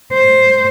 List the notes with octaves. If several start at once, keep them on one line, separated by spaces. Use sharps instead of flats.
C5